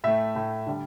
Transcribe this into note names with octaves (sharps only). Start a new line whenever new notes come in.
A2 A3 E5
A2 A3
D3 G3